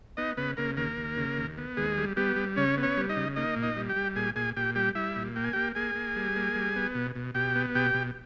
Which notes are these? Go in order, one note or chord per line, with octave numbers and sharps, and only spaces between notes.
B3 D#4 D#5
C#3 B3 B4
C#3 A#3 A#4
D#2 A#3 A#4
D#2
C#3
D#2
B3
D#2 G#3 G#4
G3
G3 B3 G4
G3
C#3 C#4 C#5
B3
C#4 C#5
G3
D#4 D#5
C#3
A#3 D#4 D#5
A#2
D#4 D#5
G3
G4 G5
G3
A#2 G#4 G#5
A#2 G#4 G#5
A#2 G4 G5
G3 G4 G5
G3 E4 E5
A#2
A#3 G5
G#5
A#3 G4 G5
A#3 G#4 G#5
A#3
G3
A#3
G3
B3
B2
B2
B2 G4 G5
B3
B2 G4 G5
B2